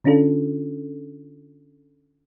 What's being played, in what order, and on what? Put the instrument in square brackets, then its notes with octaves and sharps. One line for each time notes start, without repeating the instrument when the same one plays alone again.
[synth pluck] D3 C#4 D4 F4 A4